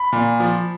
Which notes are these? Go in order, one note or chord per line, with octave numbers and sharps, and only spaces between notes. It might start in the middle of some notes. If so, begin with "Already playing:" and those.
Already playing: B5
A#2
F3